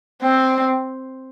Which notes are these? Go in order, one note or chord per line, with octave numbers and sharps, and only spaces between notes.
C4